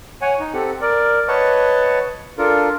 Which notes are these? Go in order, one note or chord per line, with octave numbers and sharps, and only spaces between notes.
C#5 F#5 G#5
D#4
C4 G4 A4 F#5
A#4 D5
B4 C#5 D#5 F#5 A5 C#6
D4 F4 A4 A#4